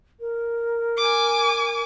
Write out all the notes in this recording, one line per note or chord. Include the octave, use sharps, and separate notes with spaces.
A#4
G#5 D6